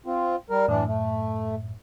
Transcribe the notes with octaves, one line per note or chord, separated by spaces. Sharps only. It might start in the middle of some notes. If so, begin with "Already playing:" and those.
C4 F4
G3 A#4
F#2 A2 E3 D4
A3